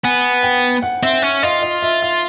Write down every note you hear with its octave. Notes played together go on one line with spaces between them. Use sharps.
B3 G#5
G5
F#5
C4 E5
C#4
F4 D#5
D#5
E5
F5